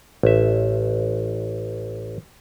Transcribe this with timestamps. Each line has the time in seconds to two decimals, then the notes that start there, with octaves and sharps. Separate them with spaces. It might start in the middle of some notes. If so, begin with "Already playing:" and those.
0.23 A1 E5